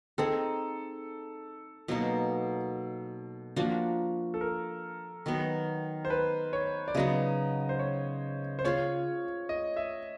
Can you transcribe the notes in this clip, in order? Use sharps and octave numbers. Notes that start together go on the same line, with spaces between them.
C4 D#4 G#4 A4
B2 F#3 A#3 D#4
F3 A#3 D4 F#4
A4
A#4
D#3 F#3 B3
C5
B4
C#5
D5
C#3 F#3 B3 D#4 D#5
C5
C#5
C5
C#4 F4 G#4 C#5
D#5
E5